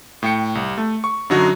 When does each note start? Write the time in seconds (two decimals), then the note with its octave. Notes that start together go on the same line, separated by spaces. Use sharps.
0.23 A2 G5 C#7
0.55 C2
0.78 A3
1.04 C#6
1.30 F#2 D3 F#3 D#4 F#4